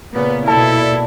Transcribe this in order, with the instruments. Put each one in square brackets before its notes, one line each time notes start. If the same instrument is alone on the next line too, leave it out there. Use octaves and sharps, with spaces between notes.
[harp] A#2 C#3 [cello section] B3
[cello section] B2 E4 [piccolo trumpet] A4 [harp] D5 [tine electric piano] A5